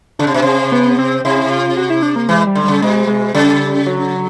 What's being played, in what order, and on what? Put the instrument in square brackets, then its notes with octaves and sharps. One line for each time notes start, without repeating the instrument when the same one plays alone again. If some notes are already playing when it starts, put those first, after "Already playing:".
[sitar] C#3 [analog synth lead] D4
[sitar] C3
B2
C3
[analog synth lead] B3
C4
[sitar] C3 [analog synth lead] E4
[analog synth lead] F4
F#4
E4
D4
A#3
[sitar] E3 [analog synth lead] G#3
[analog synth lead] G3
[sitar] D3
[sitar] C#3 [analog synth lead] G3
[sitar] B2 [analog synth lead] G#3
[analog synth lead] G#3
[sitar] C#3 [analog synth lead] G3
[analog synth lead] F#3